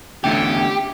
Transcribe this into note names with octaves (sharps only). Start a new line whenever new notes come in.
E2 D3 A3 E4 G4 A4